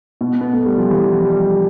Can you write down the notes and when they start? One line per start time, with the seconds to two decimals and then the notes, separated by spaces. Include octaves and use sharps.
0.21 B2
0.41 B3
0.53 A3
0.66 G3
0.78 F3
0.91 E3
1.25 G3